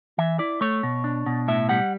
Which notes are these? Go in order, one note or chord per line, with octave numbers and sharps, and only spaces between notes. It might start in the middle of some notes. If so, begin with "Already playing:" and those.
E3 E5
E4 D5
A3 C#5
B2
D4
B2
A2 E5
G3 F#5